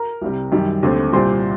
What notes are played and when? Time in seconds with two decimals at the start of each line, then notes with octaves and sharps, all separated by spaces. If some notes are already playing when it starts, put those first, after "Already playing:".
Already playing: A#4 A#5
0.22 C2 C3 G3
0.52 F#2 D#3 G3
0.83 D#2 D3 A3 C4
1.13 C2 A#2 G3 C5 C6